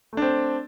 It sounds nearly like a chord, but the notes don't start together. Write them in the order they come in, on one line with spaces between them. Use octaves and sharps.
A3 D4 C4